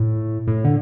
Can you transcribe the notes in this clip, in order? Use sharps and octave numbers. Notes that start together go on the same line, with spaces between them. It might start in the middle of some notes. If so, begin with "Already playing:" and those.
Already playing: A2
A2
D3